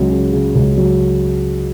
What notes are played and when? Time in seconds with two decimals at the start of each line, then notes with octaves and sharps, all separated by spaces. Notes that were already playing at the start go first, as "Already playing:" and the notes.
Already playing: C#2 F#3
0.11 C#3
0.33 C#3
0.55 C#2
0.77 F#3